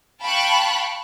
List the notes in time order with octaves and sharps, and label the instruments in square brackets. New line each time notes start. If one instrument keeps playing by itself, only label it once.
[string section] F5 G5 A5 B5 C#6 F#6